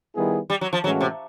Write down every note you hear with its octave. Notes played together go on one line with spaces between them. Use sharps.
D#3 G3 B3 E4 G#4
G3
F#3
F3
A2 E3 F#3 G#3 C#4 F#4
C3